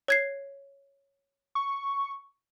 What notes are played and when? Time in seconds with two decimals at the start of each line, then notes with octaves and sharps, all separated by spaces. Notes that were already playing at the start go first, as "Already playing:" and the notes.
0.08 C#5 G#6 C7
1.55 C#6